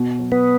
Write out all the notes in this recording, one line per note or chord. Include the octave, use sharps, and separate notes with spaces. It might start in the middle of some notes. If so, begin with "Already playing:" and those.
Already playing: B2
F#3
B3